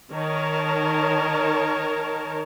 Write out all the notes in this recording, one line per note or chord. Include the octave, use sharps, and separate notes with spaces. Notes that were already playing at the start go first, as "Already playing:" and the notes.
D#3 A#4 C#5 A5